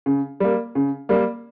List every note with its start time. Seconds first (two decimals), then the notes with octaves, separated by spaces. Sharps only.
0.06 C#3
0.40 G3 A#3
0.75 C#3
1.09 G3 A#3